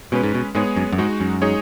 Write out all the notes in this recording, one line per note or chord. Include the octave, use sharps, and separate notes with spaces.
B2 G#3 C#4 B4
G#2
B2
G#2 G#3 B3 G#4 C#5
F#2
F#2
G#2 G#3 D#4 F#4
F#2
G#3 D#4 G#4 C#5